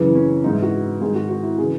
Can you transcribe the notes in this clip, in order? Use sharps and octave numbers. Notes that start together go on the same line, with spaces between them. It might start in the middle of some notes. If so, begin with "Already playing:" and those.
Already playing: F#2 C#3 E3
C#4
G#2 E3 D#4
E4
F#4
G#2 D#3 G#4
F#4
F#4
E4
C#3 E3 G#4